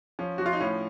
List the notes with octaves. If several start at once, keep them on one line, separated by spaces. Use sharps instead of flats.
F3 C#4
F3 F#4
F4
D#4
A2 C#4